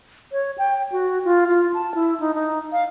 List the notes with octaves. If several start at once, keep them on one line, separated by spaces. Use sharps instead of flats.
C#5
G5
F#4
F4
F4
A5
E4
D#4
D#4
F5